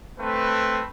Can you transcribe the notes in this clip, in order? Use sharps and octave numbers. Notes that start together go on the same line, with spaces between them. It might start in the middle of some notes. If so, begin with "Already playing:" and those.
A3 C4 B4